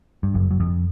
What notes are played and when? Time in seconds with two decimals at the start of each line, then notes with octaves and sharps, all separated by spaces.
0.23 G2
0.34 F#1 F#2
0.51 F#2
0.60 F2